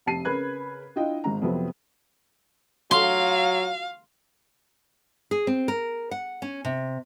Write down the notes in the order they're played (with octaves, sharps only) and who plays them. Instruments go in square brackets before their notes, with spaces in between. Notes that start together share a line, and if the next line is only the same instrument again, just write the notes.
[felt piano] F1 G4 A5 C7 D#7
C#3 A#4 B4 B5 F#6 G#6
D4 E4 F4 D#5 G5
G#1 G#2 A#5
F2 C3 F3 F#3 B3 C4
[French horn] F#3 [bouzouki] F4 F#4 [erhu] F5 [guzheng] C6
[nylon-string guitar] G#4
C4
A#4
F#5
C#4
C3